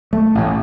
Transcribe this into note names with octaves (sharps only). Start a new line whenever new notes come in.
A3
A1 A2